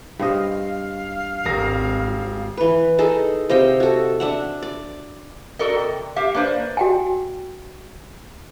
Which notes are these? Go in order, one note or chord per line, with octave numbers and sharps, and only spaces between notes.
G2 C5 D#5 F5
D#1 G#1 A#4 A#6
E3 B4
D#4 G#4 A4
C3 D#5 F5 G5
F#4 A4
D4 E5 F#5
D5
F#4 A4 A#4 D5 D#5
C3
G4 E5 F5
A#3 D4 B4 C5 D5
F#4 G5 G#5